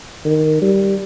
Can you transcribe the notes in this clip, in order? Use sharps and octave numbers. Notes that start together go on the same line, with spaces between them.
D#3
G3